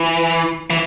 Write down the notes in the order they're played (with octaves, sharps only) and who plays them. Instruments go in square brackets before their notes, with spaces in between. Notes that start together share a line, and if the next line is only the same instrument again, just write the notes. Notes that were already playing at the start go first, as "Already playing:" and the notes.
Already playing: [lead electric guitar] E3
E3